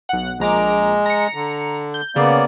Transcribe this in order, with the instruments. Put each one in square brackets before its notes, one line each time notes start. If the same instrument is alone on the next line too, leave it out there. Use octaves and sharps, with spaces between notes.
[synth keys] B1 F#5
[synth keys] A#1 A#5 D6 [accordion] G#3
[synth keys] A#5 C#7
[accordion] D3
[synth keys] G6
[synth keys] C#3 [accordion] A#3 B3 D5